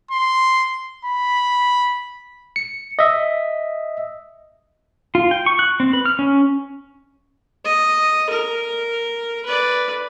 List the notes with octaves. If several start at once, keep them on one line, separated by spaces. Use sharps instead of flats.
C6
B5
C#7
D#5 E5
F4
G5
C#6
F#6
C4
B4
F6
C#4
D#5
A#4
B4 D5